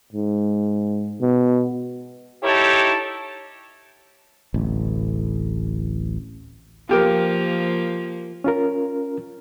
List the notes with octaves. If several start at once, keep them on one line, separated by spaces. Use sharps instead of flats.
G#2
B2
D#4 E4 G4 A4 C#5
D1 A1
F3 A#3 F4 G4 A#4
C#4 F4 A#4